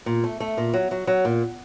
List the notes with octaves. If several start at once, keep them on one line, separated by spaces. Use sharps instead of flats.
A#2
A3
A3
A#2
F#3
F#3
F#3
A#2